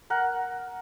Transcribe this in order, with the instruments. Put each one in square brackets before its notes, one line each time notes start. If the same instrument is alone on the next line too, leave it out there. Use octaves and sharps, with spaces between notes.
[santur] A#4 F#5